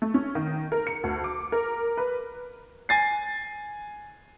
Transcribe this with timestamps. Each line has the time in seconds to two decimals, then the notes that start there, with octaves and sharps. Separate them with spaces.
0.02 A3
0.14 C#4
0.35 D#3
0.72 A#4
0.87 C#7
1.03 D2
1.24 D6
1.52 A#4
1.97 B4
2.89 G#5 A6 C7